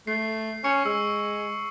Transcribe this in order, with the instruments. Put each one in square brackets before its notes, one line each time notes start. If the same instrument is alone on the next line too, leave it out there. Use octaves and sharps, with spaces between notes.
[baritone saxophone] A3 [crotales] C7
[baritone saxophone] C#4 [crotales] C#6 C#7
[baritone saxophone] G#3 [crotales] E6